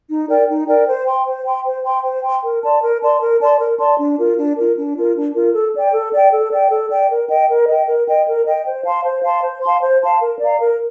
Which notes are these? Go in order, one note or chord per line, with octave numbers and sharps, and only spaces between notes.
D#4
A#4 D5 G5
D#4
A#4 D5 G5
C5
G5 C6
C5
G5 C6
C5
G5 C6
C5
G5 C6
A#4
D5 A5 C6
A#4
D5 A5 C6
A#4
D5 A5 C6
A#4
D5 A5 C6
D4
F4 A#4
D4
F4 A#4
D4
F4 A#4
D4
F4 A#4
A4
D5 G5
A4
D5 G5
A4
D5 G5
A4
D5 G5
A#4
D#5 G5
A#4
D#5 G5
A#4
D#5 G5
A#4
D#5 G5
C5
F5 A5 C6
C5
F5 A5 C6
C5
F5 A5 C6
C5
F5 A5 C6
A#4
D5 F5 A#5
A#4